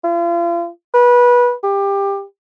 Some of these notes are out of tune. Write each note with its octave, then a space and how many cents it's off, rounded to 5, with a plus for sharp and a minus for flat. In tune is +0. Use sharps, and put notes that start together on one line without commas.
F4 -40
B4 -20
G4 +20